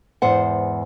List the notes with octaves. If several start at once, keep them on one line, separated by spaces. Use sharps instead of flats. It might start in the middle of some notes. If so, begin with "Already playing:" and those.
E2 G#2 C5 F#5